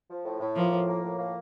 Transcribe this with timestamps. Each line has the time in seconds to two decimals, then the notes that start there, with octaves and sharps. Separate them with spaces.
0.09 F3
0.25 A2
0.40 A2
0.56 F3 A#3
0.71 A2
0.87 A#3
1.03 A2
1.18 A#3